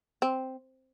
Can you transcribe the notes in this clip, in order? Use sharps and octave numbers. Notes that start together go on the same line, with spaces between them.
C4